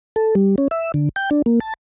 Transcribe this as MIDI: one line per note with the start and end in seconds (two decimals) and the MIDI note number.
0.16 0.35 69
0.35 0.56 55
0.58 0.68 61
0.71 0.92 76
0.94 1.09 50
1.16 1.30 79
1.31 1.42 62
1.46 1.60 58
1.60 1.74 81